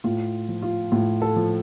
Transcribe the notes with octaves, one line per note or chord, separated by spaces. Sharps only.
A2 F4
F3
F4
A2 F4
A4
F3